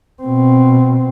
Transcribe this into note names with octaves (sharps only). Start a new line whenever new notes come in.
B2 C4